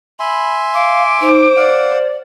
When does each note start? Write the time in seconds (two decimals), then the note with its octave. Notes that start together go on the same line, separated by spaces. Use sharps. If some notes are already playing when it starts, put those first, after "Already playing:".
0.20 E5 G#5 B5 C6
0.74 F5 D6
1.21 D#4 C5
1.57 D5 F5 F#5